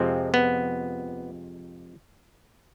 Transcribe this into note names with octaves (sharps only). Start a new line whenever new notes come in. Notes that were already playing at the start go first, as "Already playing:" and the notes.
Already playing: F2 C3 F3 G#3 C4
B3